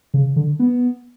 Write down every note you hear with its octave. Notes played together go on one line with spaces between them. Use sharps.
C#3
D3
B3